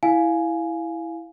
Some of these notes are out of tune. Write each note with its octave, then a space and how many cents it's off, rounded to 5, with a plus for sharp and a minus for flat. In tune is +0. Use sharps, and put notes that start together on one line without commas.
E4 +0 F5 +0 G#5 +10